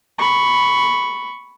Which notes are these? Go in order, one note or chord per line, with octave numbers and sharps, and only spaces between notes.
B5 C#6